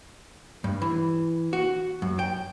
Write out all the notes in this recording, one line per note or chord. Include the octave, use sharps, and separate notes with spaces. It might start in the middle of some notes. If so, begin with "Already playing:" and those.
G2
E3
F#4
F#2
G5